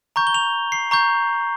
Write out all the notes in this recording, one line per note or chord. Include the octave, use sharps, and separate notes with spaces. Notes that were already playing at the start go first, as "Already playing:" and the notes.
A#5 C#6 G6
G7
F7
C7
A#5 C#6 G6